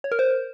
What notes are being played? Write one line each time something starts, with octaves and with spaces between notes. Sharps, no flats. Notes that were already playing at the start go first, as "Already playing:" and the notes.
C#5
A#4
C5